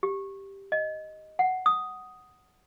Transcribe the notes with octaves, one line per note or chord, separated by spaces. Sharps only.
G4
D#5
F#5
D#6